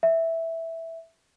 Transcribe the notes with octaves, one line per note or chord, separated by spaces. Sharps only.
E5